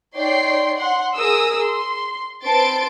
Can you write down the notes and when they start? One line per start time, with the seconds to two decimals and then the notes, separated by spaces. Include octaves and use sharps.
0.16 D#4 C#5 D5 G5 C6 C7
0.77 F#5 C6
1.15 G#4 A#4 D#6 E6
1.64 C6
2.44 C4 B4 A5 C6 A6 D7